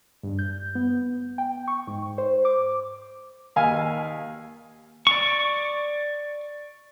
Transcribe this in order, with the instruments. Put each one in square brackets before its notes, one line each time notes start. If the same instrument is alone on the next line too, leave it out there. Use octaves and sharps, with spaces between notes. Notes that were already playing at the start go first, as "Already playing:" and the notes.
[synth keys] G2
G6
B3
G5
C#6
G#2
C5
D6
[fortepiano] D#2 F5 G#5
[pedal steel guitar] D5 C#6